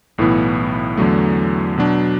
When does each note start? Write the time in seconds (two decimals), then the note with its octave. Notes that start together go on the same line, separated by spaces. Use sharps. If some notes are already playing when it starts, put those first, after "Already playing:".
0.18 B1 A2 E3 B3 E4
0.97 E2 D3 F#3 A3
1.78 B2 F#3 D4